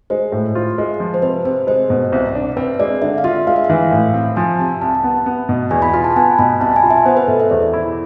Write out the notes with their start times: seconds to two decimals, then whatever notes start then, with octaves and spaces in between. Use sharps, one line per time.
0.10 G#3 C5
0.32 A2
0.55 F4
0.78 G#3
1.00 F3
1.14 C5
1.22 C3 B4
1.45 C3 C5
1.67 G#3 C5
1.90 B2
2.12 C2
2.35 D4
2.57 C4 B4
2.79 G#3 D5
3.02 D3 E5
3.18 F5
3.24 F4 E5
3.47 G#3 F5
3.56 E5
3.65 E3 F5
3.91 A2
4.14 C4
4.36 F3 G#5
4.59 C3 A5
4.81 C2 A5
5.04 B3
5.26 B3
5.49 B2
5.70 E2 G#5
5.82 B5
5.94 F4 B5
6.04 A5
6.16 B3 G#5
6.38 B2 B5
6.60 C2 A5
6.76 G#5
6.83 F4
6.90 E5
7.05 B3 C5
7.17 B4
7.27 B2 A4
7.40 E5
7.50 E2 D5
7.73 E4